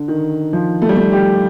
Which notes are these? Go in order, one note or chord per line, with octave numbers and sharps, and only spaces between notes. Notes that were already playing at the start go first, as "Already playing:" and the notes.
Already playing: D3
D#3
F3
A3
G3
A3
G4